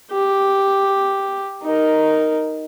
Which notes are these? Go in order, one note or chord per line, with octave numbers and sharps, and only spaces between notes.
G4
D#4 A#4